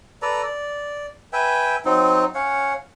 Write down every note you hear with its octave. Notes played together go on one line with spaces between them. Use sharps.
A4 B4 D5 A#5
D5
B4 E5 G5 G#5
F#3 C4 D#4
C#4 C#5 F5 F#5